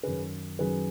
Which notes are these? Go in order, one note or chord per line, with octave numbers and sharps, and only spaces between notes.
F#2 D#3 F#3 C#4 G#4 B4
F#2 D#3 F#3 C#4 G#4 B4